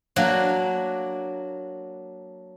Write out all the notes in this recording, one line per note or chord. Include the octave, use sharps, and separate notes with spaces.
F#3 A#3 D4 F#4